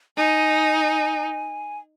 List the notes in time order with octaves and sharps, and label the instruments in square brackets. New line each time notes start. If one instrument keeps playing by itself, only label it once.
[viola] D#4 [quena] G#5